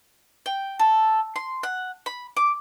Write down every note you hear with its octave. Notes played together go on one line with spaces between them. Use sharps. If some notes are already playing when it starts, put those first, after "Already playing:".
G5
A4
C6
F#5
B5
D6